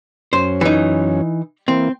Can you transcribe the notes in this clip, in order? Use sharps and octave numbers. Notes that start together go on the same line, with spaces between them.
F#2 C#4 C5
E3 D#4
E3 A#3 C4